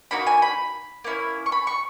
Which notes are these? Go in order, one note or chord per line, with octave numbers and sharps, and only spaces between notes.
A#3 D#4 F#4 B5
G#5
B5
A#3 C#4 E4
C#6
B5
C#6